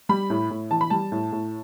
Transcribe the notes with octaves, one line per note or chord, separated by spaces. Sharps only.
G3 B5
A2
A2
E3 A5
B5
G3 A5
A2
A2